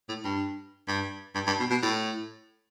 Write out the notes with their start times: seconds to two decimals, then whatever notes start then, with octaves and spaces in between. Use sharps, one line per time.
0.09 A2
0.24 G2
0.88 G2
1.35 G2
1.47 G2
1.60 B2
1.70 B2
1.82 A2